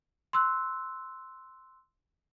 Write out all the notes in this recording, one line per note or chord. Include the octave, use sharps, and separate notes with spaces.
C6 E6 F#6